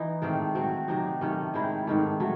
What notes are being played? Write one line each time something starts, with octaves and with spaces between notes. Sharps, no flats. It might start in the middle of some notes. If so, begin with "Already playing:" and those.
Already playing: E3 D#4
G#2 D#3 A3 C4
F#3 C4 F#4
C3 F#3 C4 D#4
C3 D#3 A3 C#4
D#3 G#3 C4 E4
G#2 D#3 A3
F#3 A3